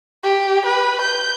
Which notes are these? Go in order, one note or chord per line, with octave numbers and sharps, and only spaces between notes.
G4
B4
G6